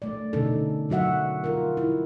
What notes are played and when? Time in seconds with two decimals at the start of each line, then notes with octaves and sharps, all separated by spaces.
0.02 A3 D5
0.33 B2 D3 E3 C#4 D#4 A4
0.89 D3 F#3 F#4 E5 F#5
1.44 F4 A#4
1.77 E4